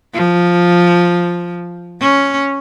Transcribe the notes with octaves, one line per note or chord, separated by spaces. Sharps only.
F3
C#4